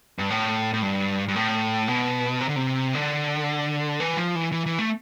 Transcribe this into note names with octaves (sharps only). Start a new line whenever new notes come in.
G2
A2
A2
G2
G2
A2
B2
C3
D3
C3
D3
E3
F3
E3
E3
E3
A3